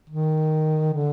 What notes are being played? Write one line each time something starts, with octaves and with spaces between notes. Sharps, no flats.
D#3
D3